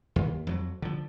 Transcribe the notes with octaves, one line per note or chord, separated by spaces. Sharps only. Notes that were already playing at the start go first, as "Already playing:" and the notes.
D#2
F2 F3 F#3
D3 F3